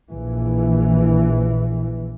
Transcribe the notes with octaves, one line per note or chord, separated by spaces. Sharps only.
A#1 E3